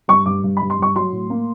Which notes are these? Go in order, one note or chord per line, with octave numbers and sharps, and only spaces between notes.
G2 C#6
G2 D6
G2
B5
G2
C6
G2 C#6
F#3 C6
A2
A#3